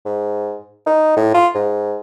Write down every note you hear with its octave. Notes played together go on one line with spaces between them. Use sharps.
G#2
D#4
A2
F4
G#2